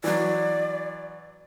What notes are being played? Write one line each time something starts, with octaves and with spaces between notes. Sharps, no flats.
E3 F#3 D5